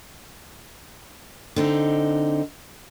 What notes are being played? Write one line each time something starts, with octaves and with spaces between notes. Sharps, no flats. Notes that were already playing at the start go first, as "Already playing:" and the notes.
D3 C4 D#4